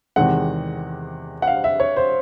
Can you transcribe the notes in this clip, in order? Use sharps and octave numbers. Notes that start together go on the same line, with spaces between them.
E2 C3 D#3 G#3 F#5
F#5
F5
E5
C#5
C5